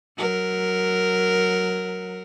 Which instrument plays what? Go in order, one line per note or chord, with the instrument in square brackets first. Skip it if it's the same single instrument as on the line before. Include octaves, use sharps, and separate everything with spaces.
[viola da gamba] F#3 A#4